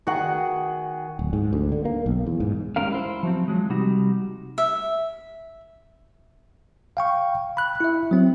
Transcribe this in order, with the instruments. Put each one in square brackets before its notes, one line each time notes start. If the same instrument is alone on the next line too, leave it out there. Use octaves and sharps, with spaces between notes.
[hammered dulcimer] D#3 G#4 G5 [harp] F#4 F#5
[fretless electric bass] D1
G#2
D2
D3
A#3
B1
E2
G#2
[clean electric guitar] G3 G#3 C#4 A#4 F5
E4 C5
F3 F#3 C4
F3 F#3 G#3
C3 G3 D#4 F#4
[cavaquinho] E5
[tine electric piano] F5 G5 C#6
B5 F#6
E4 E5
F#3 C4